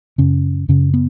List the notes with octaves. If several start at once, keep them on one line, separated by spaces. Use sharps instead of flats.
F#2 C#3 C#4
F#2 C#3 C#4
B3